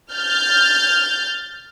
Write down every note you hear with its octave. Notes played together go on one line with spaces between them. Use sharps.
F6 G6 A6